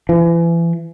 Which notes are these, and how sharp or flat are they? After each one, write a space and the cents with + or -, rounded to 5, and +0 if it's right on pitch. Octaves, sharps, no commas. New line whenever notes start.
E3 +35